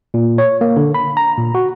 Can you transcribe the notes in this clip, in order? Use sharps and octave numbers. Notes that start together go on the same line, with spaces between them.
A#2
C#5
A#3
D3
B5
A#5
A#2
F#4